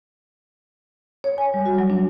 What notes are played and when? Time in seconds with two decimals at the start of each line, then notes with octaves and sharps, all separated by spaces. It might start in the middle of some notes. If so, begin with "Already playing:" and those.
1.24 C#5
1.38 G#5
1.54 G3
1.66 F#4
1.78 F#3
1.90 D4